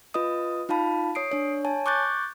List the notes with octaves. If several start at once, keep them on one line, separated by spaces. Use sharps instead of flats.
F4 B4 D#5 D#6
D#4 F4 F5 A5 B5
C#5 D#6 C7 D7
D4 C#5
C#5 G#5 A5
C#6 D6 F#6 G6 A6